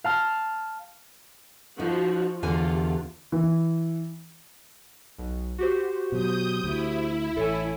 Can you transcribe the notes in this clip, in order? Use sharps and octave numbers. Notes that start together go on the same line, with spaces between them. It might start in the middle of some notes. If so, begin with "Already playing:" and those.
F5 A5 F6
F3 D#4 F#4
E2 D3 F4 G4 G#5
E3
B1
F#4 G4 C5
B2 F#3 D#6 G6
D2 E4
A1 A4 C#5 G#5